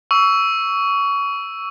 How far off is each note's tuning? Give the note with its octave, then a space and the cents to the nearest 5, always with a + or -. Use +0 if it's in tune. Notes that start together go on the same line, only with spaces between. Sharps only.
C#6 +25 E6 +0